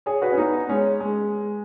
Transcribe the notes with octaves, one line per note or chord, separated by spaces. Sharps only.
G#4 C#5
F#4 B4
C#4
B3 D#4
G#3 C#4
G#3